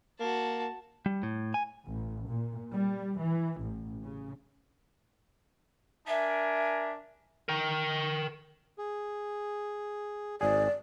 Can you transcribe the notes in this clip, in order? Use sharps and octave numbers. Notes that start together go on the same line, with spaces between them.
A#3 F#4 A5
G3
A2
G#5
A1
A#2
G3
E3
A1
C#3
D4 A#4 E5 G#5
A#4 G5
G#4
G#1 G#4 D5